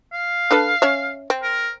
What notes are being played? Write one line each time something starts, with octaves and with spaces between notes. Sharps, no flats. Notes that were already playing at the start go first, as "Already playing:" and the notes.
F5
D4 A4 B4
C#4 C#5 E5
C4
A#4